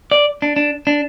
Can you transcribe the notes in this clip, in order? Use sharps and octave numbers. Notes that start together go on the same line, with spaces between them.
D5
D4
D4
D4